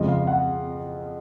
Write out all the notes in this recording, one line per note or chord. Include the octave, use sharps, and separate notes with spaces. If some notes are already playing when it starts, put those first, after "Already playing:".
Already playing: F2 C#3 F3 G#3 D#5
F5
F#5